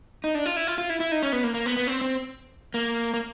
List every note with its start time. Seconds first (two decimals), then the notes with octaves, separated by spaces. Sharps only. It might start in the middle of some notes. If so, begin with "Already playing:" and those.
0.24 D#4
0.35 D4
0.46 F4
0.56 E4
0.67 F4
0.78 F4
0.90 E4
1.00 E4
1.12 D#4
1.23 C#4
1.32 B3
1.43 A#3
1.54 A#3
1.66 B3
1.76 B3
1.87 C4
2.01 C4
2.74 A#3
3.14 A#3